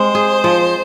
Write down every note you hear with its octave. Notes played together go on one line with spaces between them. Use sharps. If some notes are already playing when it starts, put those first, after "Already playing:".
Already playing: G#3 C4 C5
G#4
F3